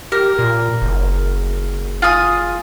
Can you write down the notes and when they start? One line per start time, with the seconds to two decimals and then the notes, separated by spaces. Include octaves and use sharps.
0.12 G4 A#4
0.39 A#2
0.82 F#1
2.02 F4 G#4 D#6